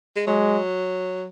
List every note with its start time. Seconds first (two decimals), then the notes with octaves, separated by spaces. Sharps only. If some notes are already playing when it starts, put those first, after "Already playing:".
0.16 G#3
0.27 F#3 G#3